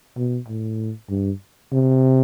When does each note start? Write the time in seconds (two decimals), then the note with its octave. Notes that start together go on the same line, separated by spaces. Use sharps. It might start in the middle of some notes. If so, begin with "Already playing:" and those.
0.17 B2
0.48 A2
1.09 G2
1.72 C3